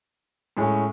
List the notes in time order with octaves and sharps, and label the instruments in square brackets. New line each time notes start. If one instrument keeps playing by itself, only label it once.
[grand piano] A2 G#3 C#4